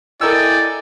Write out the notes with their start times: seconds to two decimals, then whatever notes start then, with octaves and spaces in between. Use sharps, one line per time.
0.21 E4 A4 A#4 D5 D#5 G5 G#5 E6